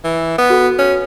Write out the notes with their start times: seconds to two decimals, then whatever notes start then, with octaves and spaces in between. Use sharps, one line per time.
0.04 E3
0.38 B3
0.50 F#4 A4
0.79 C#4